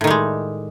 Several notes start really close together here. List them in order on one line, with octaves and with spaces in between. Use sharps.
A2 D#3 G3 G#3